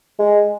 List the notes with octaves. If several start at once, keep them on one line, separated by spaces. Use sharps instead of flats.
G#3